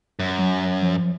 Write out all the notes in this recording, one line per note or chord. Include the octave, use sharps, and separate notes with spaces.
F#2
F#3
F3